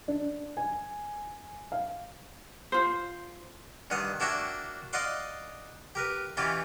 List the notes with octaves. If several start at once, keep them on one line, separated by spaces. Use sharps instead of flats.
D4
G#5
F5
F4 C5
G2 A#2 D#3 F#5 D#6
A#3 D4 F#4 C#5 E5 G5
D5 D#5 F5 F#5 C6 D6
G4 A#4 B4
B2 E3 C#4 F4 G4 B5